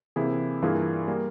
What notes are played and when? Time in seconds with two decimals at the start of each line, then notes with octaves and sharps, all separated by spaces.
0.16 C3 E3 A#3 E4 G#4
0.62 G2 E3 A#3 F4 G#4
1.08 G3 A#3